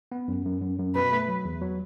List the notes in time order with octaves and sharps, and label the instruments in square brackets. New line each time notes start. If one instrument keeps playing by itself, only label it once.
[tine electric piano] B3
F#2
F#2
F#2
F#2
[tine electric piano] B2 [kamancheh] B4
[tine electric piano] A3
F#3
E2
F#3